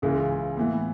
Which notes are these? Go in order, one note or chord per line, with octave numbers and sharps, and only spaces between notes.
C#2 C#3 E3 G#3
A2 E3 B3